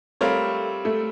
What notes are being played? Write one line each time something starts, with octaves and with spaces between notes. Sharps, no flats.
G3 A3 C4 F4 A#4 C#5
A3